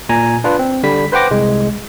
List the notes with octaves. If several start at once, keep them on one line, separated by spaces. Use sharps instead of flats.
A#2 G#5 A#5
D4 F4 B4
C4
D3 G3 B5 B6
B4 C5 F#5 G5 D6 A#6
C2 G#3